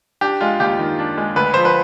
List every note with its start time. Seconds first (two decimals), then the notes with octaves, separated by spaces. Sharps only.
0.21 D4 G4
0.41 G#3 F4
0.60 D#2 G4
0.79 D#3
0.99 D4
1.17 G#3
1.36 D2 B4
1.54 F3 C5
1.65 B4